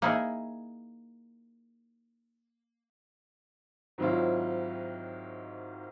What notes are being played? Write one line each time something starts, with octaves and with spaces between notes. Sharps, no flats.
A#3 D#4 E4 G#4
G#2 D#3 F#3 C4 E4 F4